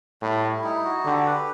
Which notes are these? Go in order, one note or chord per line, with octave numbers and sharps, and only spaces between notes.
A2 G3
E4
D#4
F#4
D3 G4
B4